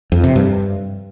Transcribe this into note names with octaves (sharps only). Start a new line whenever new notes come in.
F2
C3
G2